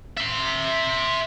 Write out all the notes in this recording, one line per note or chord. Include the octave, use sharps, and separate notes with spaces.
E5 C6